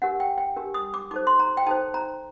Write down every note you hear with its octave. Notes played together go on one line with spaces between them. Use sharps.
D4 G4 A#4 F#5
G5
G5
D4 G4 A#4
D#6
D6
D#4 A4 C5 D6
C6
A#5
G5
D#4 A4 C5 A5
A#5